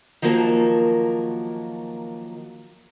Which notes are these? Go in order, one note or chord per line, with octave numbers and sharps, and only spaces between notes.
D#3 F3 F#3 A#3 A#4 A5